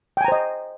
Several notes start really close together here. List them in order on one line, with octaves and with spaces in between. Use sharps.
G5 G#5 A#5 C5 D#5